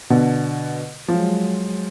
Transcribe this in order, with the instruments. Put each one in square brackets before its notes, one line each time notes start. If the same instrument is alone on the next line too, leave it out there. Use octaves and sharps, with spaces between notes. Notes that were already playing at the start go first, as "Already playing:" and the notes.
[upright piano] B2 D3
[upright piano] F3 [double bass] F#3 G#3